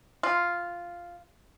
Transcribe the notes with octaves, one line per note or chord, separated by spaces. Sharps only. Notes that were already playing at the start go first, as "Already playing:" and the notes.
F4